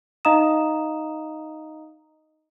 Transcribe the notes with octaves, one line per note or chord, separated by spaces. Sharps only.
D#4 D#5 F5 A#5 D#6 E7